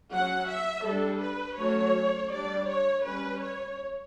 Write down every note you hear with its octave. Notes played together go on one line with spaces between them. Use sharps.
F#3 C#4 F#5
E5
G3 D4 A4
B4
F#3 A3 C#4 C#5
G3 D4 D5
C#5
G3 C#4 B4
C#5